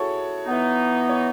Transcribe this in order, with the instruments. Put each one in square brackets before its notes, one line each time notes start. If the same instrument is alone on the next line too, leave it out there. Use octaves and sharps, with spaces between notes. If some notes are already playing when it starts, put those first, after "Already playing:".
Already playing: [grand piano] E4 F#4 G#4 A4 C#5
[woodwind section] E3 B3 D#4
[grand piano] C#5